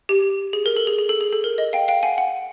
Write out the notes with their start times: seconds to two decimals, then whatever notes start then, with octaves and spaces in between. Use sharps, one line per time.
0.09 G4
0.53 G#4
0.66 A#4
0.76 A4
0.87 G#4
0.99 G#4
1.09 A4
1.21 G#4
1.33 A4
1.44 A#4
1.58 D#5
1.73 F5 G5
1.88 F5 G5
2.03 F#5 G#5
2.18 F#5